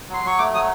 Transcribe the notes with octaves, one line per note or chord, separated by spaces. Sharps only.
F#3 C6
F#3 C#6
A3 D6
F#3 D#6